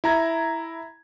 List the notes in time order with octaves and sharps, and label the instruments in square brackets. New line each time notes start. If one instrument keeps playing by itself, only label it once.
[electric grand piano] E4 A#5 G#6